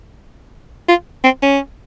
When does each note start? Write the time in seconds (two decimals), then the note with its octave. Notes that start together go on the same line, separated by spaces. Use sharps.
0.88 F4
1.24 C4
1.42 C#4